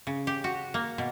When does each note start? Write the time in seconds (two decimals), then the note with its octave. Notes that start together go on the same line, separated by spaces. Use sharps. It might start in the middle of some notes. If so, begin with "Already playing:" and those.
0.07 C#3
0.27 G4
0.44 F#4
0.74 A#3
0.98 B2